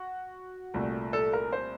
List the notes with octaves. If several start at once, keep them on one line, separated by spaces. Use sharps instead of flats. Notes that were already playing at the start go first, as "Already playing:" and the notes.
Already playing: F#4
C2 A#2 A3
A4
A#4
C5